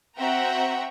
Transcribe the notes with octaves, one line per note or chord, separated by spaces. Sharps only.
C4 F#4 E5 F#5 G5 A#5